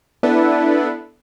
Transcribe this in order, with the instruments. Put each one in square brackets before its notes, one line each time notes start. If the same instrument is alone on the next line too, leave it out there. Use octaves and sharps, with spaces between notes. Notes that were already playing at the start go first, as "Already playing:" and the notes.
[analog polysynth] B3 D4 E4 A4 B4